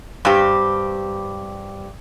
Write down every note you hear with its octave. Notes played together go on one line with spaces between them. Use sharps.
G2 C4 G4